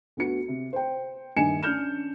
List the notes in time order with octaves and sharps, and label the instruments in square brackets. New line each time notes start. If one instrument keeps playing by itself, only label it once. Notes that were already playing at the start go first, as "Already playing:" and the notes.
[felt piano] D2 B3 F#4 C#7
C3
C5 G5
A#1 G2 D#3 G#5 C#7 E7
C#4 D4 F6 G6 E7